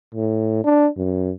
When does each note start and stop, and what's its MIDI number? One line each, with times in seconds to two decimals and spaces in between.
0.15 0.60 45
0.64 0.87 62
0.97 1.32 42